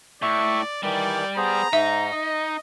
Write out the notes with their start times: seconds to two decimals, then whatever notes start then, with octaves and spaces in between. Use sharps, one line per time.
0.22 A2 D5 E5 C#6
0.83 D#3 E3 G3 D5
1.37 B3 G#4 C5 A#5
1.73 G#2 D#4 E5
2.12 D#5